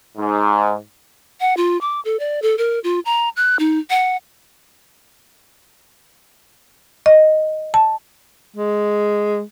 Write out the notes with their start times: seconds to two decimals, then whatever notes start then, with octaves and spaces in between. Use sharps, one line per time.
0.18 G#2
1.41 F#5
1.57 F4
1.81 D6
2.05 A4
2.20 D5
2.42 A4
2.58 A#4
2.84 F4
3.05 A#5
3.37 F#6
3.59 D#4
3.90 F#5
7.06 D#5
7.74 A5
8.57 G#3